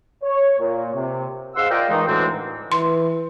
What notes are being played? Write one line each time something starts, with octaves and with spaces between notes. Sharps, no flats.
C#5
A#2
C3
G#2 F5 F#5 C6 E6
F4 A#4 D5 D#5 G5
D#3 E3 G#3 D#4
D2 A2 E3 G#3 C4
E3 C6